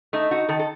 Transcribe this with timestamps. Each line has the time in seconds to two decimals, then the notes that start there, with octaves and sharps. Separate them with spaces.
0.13 A3 D#4
0.31 D#4 F#4
0.49 D#3 A4
0.59 A4